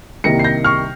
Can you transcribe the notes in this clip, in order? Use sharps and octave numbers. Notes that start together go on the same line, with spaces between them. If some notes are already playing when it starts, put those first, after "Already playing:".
C2 C3 D#3 G3 A#3 A#6 C#7
C7
G6 A#6
C#6 F6